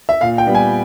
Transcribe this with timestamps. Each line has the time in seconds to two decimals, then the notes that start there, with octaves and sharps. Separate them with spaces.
0.09 E5
0.21 A#2 F5
0.38 G5
0.47 G3 B3
0.55 G#5